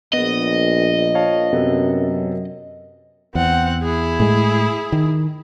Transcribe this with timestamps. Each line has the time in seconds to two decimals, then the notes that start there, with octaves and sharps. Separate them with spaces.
0.13 A#1 B3 D#5
1.15 C#5 F5 A5
1.53 F#2 C3 B3 A4
3.35 E2 C4 F#5
3.82 E4 G#4
4.20 A2 G#3
4.92 D#3